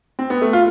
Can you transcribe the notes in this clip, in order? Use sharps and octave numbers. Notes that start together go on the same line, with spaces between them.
C4
B3
A3
F4